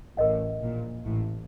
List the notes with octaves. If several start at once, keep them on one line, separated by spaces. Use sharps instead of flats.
A1 A2 A#4 D#5 F#5
A#1 A#2
A1 A2